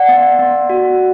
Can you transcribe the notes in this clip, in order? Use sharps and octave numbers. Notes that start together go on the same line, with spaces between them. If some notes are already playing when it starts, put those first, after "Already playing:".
Already playing: D5 F#5
B3
B3
F#4